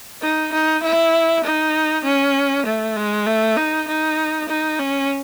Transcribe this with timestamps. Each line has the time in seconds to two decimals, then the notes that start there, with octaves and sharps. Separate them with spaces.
0.22 D#4
0.52 D#4
0.83 E4
1.44 D#4
2.05 C#4
2.66 A3
2.97 G#3
3.27 A3
3.57 D#4
3.88 D#4
4.49 D#4
4.80 C#4